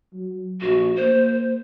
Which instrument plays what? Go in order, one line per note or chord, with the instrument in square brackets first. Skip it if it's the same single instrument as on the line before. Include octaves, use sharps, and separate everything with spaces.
[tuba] F#3
[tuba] A#1 [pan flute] F#4
[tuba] A#3 [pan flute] C5